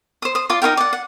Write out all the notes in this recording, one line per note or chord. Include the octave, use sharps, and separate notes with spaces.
C5 D#6
C5 D#6
F4 D5 C6
D#4 F4 A#4 G5
D5 F#5
F#5